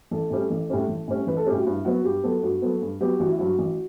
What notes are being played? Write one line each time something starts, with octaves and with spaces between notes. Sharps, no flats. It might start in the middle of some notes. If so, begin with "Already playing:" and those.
A1 A4
A2 G3 C#4
A1
A2 G3 C#4
A1
A2 G3 C#4
A1 B4
A4
A2 G3 C#4 G4
F#4
G2 E4
F#3 B3 F#4
G2 G4
F#3 B3 A4
G2 F#4
F#3 B3 A4
G2
F#3 B3 G4
A1 F#4
E4
G2 F#3 F#4
A1